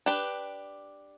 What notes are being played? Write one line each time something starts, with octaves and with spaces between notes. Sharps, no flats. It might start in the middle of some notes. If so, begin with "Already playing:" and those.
D4 G4 B4